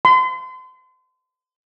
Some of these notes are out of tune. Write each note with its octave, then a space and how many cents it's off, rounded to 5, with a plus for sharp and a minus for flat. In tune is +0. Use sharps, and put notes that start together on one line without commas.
C6 -35